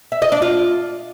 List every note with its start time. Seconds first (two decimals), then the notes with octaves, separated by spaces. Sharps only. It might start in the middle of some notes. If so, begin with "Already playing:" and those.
0.12 E5
0.22 D#5
0.32 D4
0.42 F4